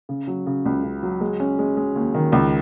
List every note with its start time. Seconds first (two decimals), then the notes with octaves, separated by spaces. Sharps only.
0.09 C#3
0.27 F#3
0.47 C#3
0.65 C#2
0.84 C#3
1.03 F#3
1.21 G#3
1.40 C#4
1.59 G#3
1.77 G#3
1.96 D#2
2.14 D#3
2.32 C#2